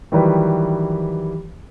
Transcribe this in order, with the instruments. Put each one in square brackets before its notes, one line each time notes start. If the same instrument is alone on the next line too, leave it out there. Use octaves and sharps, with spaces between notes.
[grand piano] D#3 E3 F#3 G3 B4